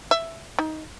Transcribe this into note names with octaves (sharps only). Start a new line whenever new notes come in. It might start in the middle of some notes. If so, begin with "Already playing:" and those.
E5
D#4